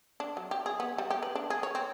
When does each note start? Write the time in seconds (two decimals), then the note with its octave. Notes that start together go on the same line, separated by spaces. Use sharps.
0.20 D4
0.37 F#3
0.51 G4
0.66 G#4
0.80 B3
0.98 G3
1.10 G4
1.23 B4
1.35 D4
1.50 G#4
1.63 C#5
1.75 C4